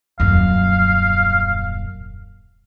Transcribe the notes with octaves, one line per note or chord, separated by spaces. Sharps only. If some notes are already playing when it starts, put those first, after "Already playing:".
D#1 F#2 F5